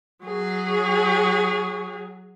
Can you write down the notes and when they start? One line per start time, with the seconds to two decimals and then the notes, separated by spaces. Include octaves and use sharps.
0.25 F#3 G#4